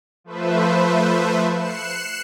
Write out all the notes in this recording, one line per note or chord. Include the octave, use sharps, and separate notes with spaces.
F3 A3 B4 C5 E5
F#6 C7 C#7 E7